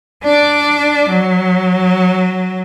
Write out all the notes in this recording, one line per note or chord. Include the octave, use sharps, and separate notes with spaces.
D4 D5
F#3